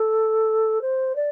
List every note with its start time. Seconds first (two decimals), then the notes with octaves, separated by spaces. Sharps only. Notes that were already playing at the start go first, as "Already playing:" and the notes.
Already playing: A4
0.81 C5
1.15 D5